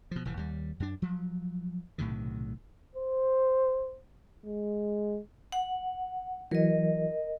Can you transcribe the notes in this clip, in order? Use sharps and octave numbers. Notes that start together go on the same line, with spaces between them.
B2 F3
F1 A2 E3
D#2 G3
F#2 D4
F3 F#3
B1 A2 C3 D#3
C5
G#3
F#5
E3 F#3 A#4 D#5